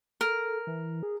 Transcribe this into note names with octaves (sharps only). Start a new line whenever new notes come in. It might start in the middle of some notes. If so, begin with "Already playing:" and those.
A4 A#4
E3
G#4